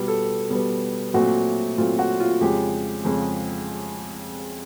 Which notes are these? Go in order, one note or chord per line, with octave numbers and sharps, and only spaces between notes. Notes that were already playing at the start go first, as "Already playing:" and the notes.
Already playing: B2 G3 B3
A4
B2 G3 B3
A#2 F#3 A3 C4 F#4
A#2 F#3 A3 C4 F4
F#4
F4
F2 C#3 F3 G#3 G4
F2 C#3 F3 G#3